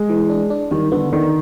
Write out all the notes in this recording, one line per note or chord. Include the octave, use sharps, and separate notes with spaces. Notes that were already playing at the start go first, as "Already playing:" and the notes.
Already playing: G#3
E3
D4
D4
D#3 G3
D3 B3
D3 D#3